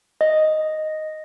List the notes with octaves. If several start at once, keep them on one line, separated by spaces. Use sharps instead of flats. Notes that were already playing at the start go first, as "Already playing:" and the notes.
D#5